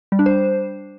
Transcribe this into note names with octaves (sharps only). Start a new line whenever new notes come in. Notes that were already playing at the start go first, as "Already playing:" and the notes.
G3
D4
C5